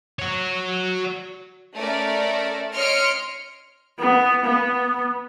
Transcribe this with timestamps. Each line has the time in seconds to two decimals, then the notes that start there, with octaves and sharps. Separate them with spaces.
0.19 F#4 C#5
1.75 A3 C#4 A#4 D5
2.74 C#5 D#5 C6 F6 C#7 D7
3.99 B3
4.44 B3